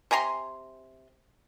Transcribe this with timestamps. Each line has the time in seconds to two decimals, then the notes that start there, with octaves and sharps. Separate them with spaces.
0.11 C3 G#5 A#5 C6